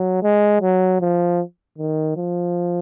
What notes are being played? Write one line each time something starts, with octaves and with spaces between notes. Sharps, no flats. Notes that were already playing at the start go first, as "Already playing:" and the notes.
Already playing: F#3
G#3
F#3
F3
D#3
F3